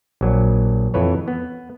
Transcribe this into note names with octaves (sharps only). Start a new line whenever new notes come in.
A#1 F#3
F2 E3 A4 B4 C#5
B3